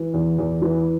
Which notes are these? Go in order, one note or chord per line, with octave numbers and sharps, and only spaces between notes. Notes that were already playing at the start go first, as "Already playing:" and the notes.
Already playing: E3
E2
E2
E3